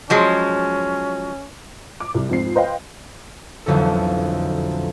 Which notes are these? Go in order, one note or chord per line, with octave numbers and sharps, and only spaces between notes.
F3 F#3 G#3 C#4
D6
C2
F2 G#2 C4 C7
B4 C5 D#5 F5 G5
E1 B1 F2 D3 A4